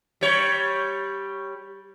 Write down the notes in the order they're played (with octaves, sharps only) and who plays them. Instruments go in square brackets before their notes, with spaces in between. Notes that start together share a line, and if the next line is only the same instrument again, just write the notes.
[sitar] G3 C#5